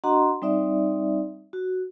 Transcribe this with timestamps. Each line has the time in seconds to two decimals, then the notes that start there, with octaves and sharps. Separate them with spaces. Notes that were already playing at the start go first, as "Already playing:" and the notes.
0.04 D4 F#4 D#5 F#5 A#5 C6
0.42 G3 C4 D#4 D5 E5
1.53 F#4